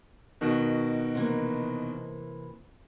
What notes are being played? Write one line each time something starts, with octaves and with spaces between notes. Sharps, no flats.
B2 D#3 F#4
C3 E3 A#3